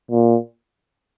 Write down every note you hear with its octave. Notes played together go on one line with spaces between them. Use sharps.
A#2